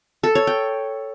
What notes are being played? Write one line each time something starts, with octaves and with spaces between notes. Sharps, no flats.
A4
C#5
G5